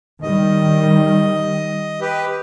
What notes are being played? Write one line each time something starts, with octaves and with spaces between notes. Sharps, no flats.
D#3 G3 D#5
G4 B4